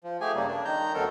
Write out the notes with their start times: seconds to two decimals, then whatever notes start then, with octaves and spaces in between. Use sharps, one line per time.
0.04 F3
0.21 A3 G4 G#4 G#5
0.35 G2 C#3 G3 A#3
0.48 D4
0.65 D#3 A#5 G6
0.94 D2 F#3 B3 A4 A#4